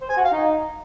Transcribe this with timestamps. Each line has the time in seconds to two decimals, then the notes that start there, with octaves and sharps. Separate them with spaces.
0.02 C5
0.09 G#5
0.17 F#4
0.25 F5
0.32 D#4